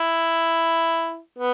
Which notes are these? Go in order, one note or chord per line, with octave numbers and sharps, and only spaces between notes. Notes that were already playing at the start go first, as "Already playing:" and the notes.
Already playing: E4
B3